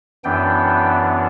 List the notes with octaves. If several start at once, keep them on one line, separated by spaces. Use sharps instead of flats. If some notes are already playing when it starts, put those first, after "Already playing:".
F#2 E3 B3 D4 G5